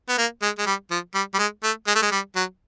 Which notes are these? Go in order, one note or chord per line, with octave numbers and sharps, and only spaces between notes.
B3
A#3
G#3
G#3
G3
F3
G3
G3
G#3
A3
G#3
A3
G#3
G3
F#3